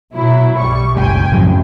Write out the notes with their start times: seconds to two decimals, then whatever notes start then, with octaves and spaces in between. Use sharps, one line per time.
0.14 B2 F#3 E4
0.58 B1 G3 C#6
0.97 F#1 C#2 G5 G#5
1.32 F#2 A2 F3 F#3